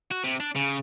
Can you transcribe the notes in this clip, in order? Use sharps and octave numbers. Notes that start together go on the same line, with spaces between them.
F#4
C3
D4
C#3